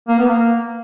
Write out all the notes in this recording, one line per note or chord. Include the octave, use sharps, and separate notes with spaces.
A#3
B3
A#3